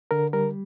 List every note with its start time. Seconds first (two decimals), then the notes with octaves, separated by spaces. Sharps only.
0.11 D3 A#4
0.33 G3 A#4